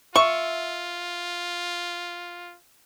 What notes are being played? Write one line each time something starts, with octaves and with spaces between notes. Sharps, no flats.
F4 E5 C#6